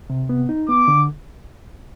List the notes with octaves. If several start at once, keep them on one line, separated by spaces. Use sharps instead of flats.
C3
B3
D#4
B3 D6
D3